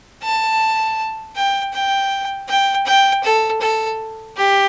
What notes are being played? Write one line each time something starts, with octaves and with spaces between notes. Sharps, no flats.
A5
G5
G5
G5
G5
A4
A4
G4